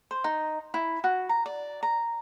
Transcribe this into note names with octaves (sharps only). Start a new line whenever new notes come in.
C5
D#4
E4
F#4
A#5
D5
A#5